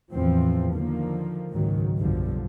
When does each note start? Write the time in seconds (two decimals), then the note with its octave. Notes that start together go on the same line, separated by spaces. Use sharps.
0.13 E2 A2 E3 F3 C4
0.72 D3 D#3 F3 A#3
1.52 F#1 C#2 G#2 D#3 F#3
1.98 F#1 B1 G2 D3 F3